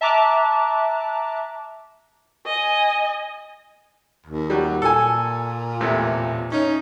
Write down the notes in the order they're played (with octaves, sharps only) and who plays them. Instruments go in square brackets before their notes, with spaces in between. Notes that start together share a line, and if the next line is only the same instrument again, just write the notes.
[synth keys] E5 A5 A#5 D6 F#6
[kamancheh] D#5 G#5
[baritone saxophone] D#2
[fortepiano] F#3 G3
[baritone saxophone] A#2 [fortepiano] A4 G#5
[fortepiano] E2 A2 C3
[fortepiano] C#4 [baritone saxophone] D#4